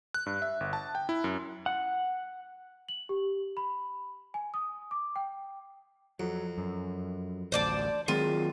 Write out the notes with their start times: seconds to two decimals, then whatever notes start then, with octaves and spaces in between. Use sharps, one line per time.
0.14 F#6
0.26 G2
0.42 E5
0.60 G1
0.73 A5
0.95 G5
1.09 E4
1.24 F#2
1.66 F#5
2.89 F#7
3.09 G4
3.57 B5
4.34 G#5
4.54 D#6
4.91 D6
5.16 G5
6.20 F2 F#3
6.58 F#2
7.52 A1 D2 C5 D5 A5
8.08 D#3 F#3 G#3 C4 F4